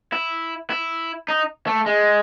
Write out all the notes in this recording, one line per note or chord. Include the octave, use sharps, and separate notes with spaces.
E4
E4
D#4
A3
G#3